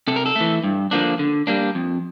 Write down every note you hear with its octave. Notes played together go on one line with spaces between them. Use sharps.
C3 A4
A#4
A4
E3 A3
G2
D3 F3 A#3 D4
D3
G3 A#3 D4
F2